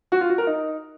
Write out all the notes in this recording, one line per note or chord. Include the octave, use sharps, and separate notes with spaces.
F#4
F4
F#4
A#4
D#4